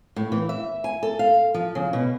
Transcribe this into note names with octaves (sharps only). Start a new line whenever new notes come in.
A2
E3
E5
G#5
A4
F5
F3
C#3
B2